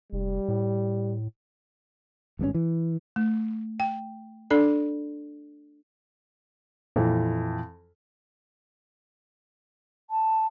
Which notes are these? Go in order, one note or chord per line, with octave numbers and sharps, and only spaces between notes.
F1 G3
A2
G#1 G2 C#3 C#4
E3
A3
G5
D4 A4 D5
F2 A#2 E3
A5